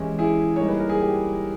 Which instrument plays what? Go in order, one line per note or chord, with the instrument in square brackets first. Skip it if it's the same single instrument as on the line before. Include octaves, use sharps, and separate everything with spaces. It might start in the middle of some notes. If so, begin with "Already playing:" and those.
Already playing: [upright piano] E3 G#3 C#4 E4 G4
E4 G#4
G3 A#3 D#4 C#5
B4
A#4
G#4
G4